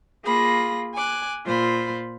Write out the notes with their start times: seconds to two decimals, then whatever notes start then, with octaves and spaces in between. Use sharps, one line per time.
0.25 A#3 F4 G#4 B5 A#6
0.94 G#5 D6 F#6
1.45 A#2 F4 C5 B5